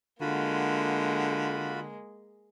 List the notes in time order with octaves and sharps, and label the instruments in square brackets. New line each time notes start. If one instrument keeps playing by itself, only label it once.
[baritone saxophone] D3 [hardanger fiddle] G#3 A#3 [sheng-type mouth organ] F4 F#4 B5